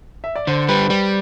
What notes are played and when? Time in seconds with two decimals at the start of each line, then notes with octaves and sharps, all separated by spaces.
0.24 E5
0.36 D5
0.47 D3 C5
0.69 G3 B4
0.90 G3 D5